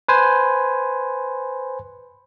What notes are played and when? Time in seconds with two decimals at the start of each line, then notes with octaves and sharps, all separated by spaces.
0.08 B4 C5 G#5